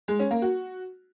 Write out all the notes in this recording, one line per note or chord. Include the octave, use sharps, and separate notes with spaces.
G#3
C#4
A#3
F#4